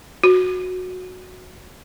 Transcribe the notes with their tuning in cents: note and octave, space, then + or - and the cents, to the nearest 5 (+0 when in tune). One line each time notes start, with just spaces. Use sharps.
F#4 -15